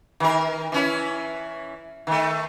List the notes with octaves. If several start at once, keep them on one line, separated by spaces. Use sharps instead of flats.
D#3 A#4
E3 C#4 E4
D#3 A3